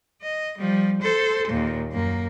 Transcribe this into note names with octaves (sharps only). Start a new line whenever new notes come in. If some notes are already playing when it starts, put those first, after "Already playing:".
D#5
F3 G3
A4 C5
D#2 A#2
F#2 A#3